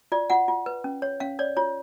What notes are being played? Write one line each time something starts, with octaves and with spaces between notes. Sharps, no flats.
F4 D5
F4 F#5
F4
B4
C#4
C#5
C#4 F5
C#5 D5
F4 C#5